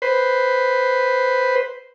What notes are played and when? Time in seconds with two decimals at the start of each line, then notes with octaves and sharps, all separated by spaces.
0.02 B4 C5